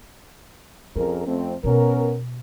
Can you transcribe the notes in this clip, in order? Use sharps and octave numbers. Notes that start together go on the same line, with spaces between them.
F2 C#4 G#4 A#4
F2 A3 C4
B2 B3 C#4 A#4